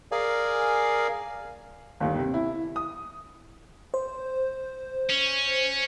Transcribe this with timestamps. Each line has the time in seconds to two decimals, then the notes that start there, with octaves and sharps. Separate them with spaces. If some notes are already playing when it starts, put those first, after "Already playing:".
0.12 G#4 A#4 D5 F5 G#5
2.00 G1 D#2
2.19 C3
2.34 E4
2.76 D#6
3.94 C5
5.10 C#4